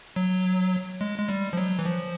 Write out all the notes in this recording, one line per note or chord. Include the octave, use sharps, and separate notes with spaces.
F#3
G#3
G#3
G3
F3
F#3
E3
F3